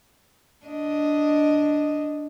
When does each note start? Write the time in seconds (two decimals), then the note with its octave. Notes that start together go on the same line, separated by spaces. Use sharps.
0.67 D4 D#5